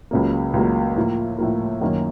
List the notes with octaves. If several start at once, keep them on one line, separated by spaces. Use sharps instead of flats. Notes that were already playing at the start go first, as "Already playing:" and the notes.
C#2 C#3 F#3 A#3
C#2 C#3 F#3 A#3
A2 F3 A#3
A2 F3 A#3
F#2 D#3 A#3 C#4